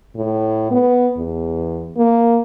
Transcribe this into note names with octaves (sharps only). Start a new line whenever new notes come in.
A2
B3
E2
A#3